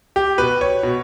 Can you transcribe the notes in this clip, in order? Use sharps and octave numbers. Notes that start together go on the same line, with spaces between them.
G4
B2 B4
C#5
B2